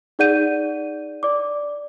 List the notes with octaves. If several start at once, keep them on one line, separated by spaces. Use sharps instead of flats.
D#4 G#4 D5 F#5 G6 D#7
D5 D6